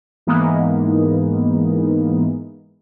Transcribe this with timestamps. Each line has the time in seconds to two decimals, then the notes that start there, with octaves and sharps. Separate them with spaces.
0.27 G#2 E3 G#3 A#3 B3 D#4